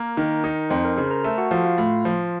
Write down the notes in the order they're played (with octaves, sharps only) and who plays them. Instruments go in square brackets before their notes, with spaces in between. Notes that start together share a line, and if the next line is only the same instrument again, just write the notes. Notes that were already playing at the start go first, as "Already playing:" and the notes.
Already playing: [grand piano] A#3 [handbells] A#4 A#5
[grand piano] D#3
D#4
[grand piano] F2 [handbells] C5 C6
[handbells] A#4 A#5
[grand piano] C#3 [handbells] C5 C6
[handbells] A#4 A#5
[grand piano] A3 [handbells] A4 A5
[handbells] F#4 F#5
[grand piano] F3 [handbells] F4 F5
[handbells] F4 F5
[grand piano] A2
F3